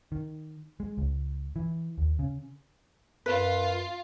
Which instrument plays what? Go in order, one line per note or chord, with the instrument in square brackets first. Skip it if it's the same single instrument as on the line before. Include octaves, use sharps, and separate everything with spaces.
[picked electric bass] D#3
G#3
C#2
E3
D#2
C#3
[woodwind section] F#2 [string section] F4 [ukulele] B4